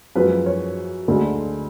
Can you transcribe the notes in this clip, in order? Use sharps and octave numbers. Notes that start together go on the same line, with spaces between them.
F#2 F3 G#3 B4
C#5
D2 D3 G#3